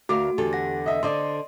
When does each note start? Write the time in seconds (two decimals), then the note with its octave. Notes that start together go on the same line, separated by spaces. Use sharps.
0.09 D2 F#4 A#4 F5 D6
0.38 E2 D3 G4 A4
0.53 F#5 A#6
0.86 D#5 E5
1.03 D3 C5 D5 D#5 C6